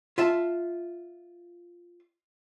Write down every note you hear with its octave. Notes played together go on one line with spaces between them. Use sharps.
F4 E5 A5